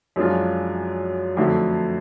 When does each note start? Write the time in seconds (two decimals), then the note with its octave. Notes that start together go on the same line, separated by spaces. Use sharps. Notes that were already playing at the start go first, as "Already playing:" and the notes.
0.16 F#2 F3 G#3 D4 F4
1.37 F2 D3 F#3 A3